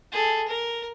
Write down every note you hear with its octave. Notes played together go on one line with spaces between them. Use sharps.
G#4 A4
A#4